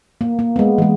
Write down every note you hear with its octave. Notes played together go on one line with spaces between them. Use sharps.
A#3
A#3
G#3 B3
E3 G#3